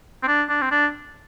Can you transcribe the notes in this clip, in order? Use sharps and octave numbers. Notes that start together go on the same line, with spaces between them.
C4
D4
D4
C4
D4